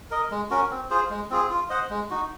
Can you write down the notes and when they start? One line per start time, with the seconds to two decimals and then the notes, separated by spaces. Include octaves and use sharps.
0.11 A#4 D#5
0.31 G#3
0.50 C#4 F#4 A#4
0.71 C4
0.90 F4 G#4 C5
1.10 G#3
1.30 C4 F4 G#4
1.50 F4
1.70 C5 D#5 F#5
1.90 G#3
2.10 D#4 F#4